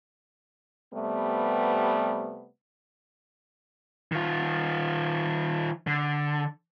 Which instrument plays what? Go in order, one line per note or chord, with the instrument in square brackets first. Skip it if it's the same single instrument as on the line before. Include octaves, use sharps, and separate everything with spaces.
[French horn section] C3 G3 A3 B3
[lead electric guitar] D#3 F4
D3